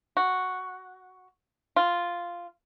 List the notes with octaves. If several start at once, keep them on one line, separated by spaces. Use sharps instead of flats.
F#4
F4